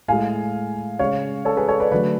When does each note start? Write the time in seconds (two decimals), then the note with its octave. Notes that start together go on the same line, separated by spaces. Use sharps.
0.08 A2 G#3 F5 G#5
0.99 C#3 G#3 C#5 F5
1.45 A4 C#5
1.57 G#4 B4
1.68 A4 C#5
1.80 B4 D5
1.91 D3 F#3 A3 B4 D5